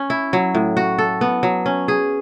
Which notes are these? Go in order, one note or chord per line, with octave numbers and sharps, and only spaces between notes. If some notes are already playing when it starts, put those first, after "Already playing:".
Already playing: C#4
E4
F#3
A2
F#4
A4
B3
F#3
C#4
G#4